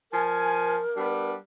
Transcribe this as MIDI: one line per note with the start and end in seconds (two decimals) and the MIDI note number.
0.12 0.78 53
0.12 1.32 70
0.12 0.78 80
0.95 1.35 55
0.95 1.35 59
0.95 1.35 62